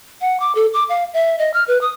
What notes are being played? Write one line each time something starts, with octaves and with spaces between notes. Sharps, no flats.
F#5
D6
A4
D6
F5
E5
D#5
F6
B4
D#6